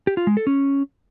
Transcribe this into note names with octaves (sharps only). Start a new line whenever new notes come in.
G4
F4
G#3
A4
C#4